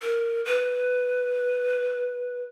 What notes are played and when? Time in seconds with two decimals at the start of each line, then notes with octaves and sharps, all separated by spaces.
0.02 A#4
0.45 B4